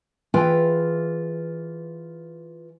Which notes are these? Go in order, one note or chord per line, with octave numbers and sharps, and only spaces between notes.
E3 F4 G#4 B4 G5